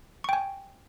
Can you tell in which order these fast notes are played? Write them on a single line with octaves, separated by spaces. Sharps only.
C#6 G5 G#5